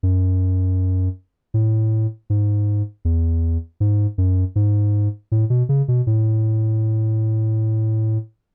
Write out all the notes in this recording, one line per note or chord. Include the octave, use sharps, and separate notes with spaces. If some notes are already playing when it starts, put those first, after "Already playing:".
F#2
A2
G#2
E2
G#2
F#2
G#2
A2
B2
C#3
B2
A2